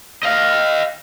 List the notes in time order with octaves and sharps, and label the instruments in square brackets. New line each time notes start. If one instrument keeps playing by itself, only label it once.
[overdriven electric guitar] D#5 F5